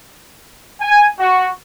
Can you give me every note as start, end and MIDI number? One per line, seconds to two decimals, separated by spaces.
0.80 1.07 80
1.19 1.48 66